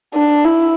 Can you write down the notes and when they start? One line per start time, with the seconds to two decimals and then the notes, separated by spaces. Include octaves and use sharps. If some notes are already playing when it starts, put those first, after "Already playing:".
0.15 D4
0.45 E4